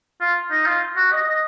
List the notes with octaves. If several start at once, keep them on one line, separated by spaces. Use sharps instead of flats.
F4
D#4
F4
F#4
D#5
D#5